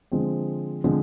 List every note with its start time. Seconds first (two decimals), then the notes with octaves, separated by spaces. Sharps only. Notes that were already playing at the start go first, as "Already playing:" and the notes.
0.12 D3 F3 G#3 C4
0.84 D3 F3 G#3 C4